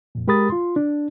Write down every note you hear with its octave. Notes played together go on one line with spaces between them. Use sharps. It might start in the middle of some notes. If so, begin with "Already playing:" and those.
F2 A#2
G#3 G4 A#4 B5 D#6 A6
F4 C6
D4